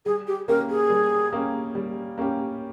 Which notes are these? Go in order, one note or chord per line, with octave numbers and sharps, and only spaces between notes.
G3 G#4
G4
A#3 C#4 G4 A#4
G#4
G3
A#3 C#4 G4
G3
A#3 C#4 G4